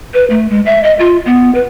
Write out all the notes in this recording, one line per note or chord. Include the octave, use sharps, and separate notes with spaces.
B4
A3
G#3
E5
D#5
F4
B3
B4